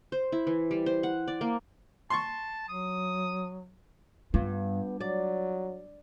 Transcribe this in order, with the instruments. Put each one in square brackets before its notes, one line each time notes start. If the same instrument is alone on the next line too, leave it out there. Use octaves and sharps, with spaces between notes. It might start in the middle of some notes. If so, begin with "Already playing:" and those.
[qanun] C5
E4
E3
G3
C5
F#5
D5
A#3
[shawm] A5 [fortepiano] C6 C#6
[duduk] F#3 [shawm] D#6
[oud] G2 [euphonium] B3 [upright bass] F4
[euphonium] F#3 [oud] D5